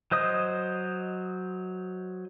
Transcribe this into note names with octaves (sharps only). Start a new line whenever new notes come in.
F#3 C5 D#5 D#6